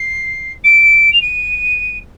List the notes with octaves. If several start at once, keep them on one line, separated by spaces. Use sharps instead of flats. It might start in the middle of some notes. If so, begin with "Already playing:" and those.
Already playing: C7
D7
F7
D#7